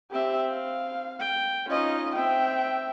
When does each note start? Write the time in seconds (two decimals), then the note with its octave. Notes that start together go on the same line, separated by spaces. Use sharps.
0.12 C4 G4 E5
0.50 F5
1.20 G5
1.69 C#4 D#4 F4 D#5
2.16 C4 E5 G5